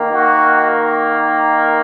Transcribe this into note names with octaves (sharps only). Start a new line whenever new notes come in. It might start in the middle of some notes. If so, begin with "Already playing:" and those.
Already playing: D#3 A#3
F#4